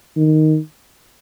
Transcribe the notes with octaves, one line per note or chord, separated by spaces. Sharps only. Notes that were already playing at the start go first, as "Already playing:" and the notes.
D#3